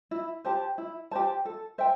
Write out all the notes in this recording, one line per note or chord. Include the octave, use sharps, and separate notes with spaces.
E4
G4 C5 A5
E4
G4 C5 A5
A4
C5 E5 G5